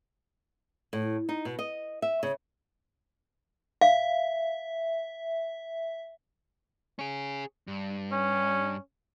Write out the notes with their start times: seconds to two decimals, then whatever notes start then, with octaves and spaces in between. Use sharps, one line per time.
0.93 A2
1.29 D#4
1.45 B2
1.59 D#5
2.02 E5
2.23 C#3
3.81 E5 F5
6.99 C#4 G#4
7.67 G2
8.12 C#4